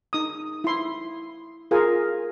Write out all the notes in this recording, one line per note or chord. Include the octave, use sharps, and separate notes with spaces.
D#4 D#6
E4 C6
F4 G#4 A#4 G#5